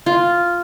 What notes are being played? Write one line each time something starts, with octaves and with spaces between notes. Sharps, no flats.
F4